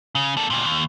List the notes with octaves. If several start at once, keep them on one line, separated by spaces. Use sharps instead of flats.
C#3
A#3 A4
D2 A#2
D#2